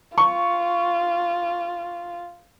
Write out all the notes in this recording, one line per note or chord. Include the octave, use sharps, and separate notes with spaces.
F4 C#6